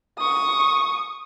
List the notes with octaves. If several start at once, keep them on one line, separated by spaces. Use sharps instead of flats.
C#6 D#6